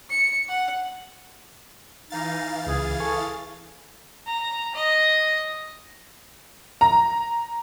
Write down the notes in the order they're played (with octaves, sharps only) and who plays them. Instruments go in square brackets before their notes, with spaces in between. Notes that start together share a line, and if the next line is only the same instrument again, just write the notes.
[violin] C#7
F#5
[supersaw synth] E3 F5 A6 [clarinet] D#4
[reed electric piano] C#2 [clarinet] G#4
[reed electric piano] A4 G#5 C#6
[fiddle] A#5
D#5
[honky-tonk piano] A#5